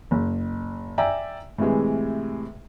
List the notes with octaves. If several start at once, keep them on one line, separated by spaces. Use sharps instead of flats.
F#1
D5 E5 G5 G#5 A#5 E6
A2 C3 E3 G#3